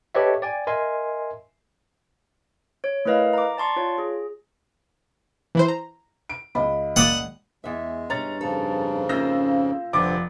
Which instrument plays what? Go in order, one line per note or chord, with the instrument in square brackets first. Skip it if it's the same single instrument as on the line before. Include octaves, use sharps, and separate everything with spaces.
[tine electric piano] G4 A4 B4 C#5 D#5 E5
D5 G5 G#5
A#4 D#5 E5 G#5 C6
[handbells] C#5
A3 E4 A#4 B4 D#5 F5
A#5 D6
D5 A5 C6 C#6
F4 C#5
G#4
[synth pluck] E3 E4 C5
A#5
[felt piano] D7
C#2 D#5 B5
[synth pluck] A#2 D5 [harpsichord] F#5 D#6
[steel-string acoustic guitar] E2 E5 [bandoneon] G#3
[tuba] G2 [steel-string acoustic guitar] C#4 [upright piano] A#5 A6
[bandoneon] F2 G#2 C#3 [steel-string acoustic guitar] A4
[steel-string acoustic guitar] A#3 F4 [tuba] C#4 [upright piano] E6 G6 A#6
[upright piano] F1 D5 D6 [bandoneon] G2 D3 C4 [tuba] F3